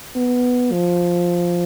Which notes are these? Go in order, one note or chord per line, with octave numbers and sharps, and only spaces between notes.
B3
F3